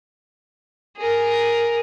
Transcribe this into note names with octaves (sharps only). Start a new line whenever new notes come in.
G#4 A#4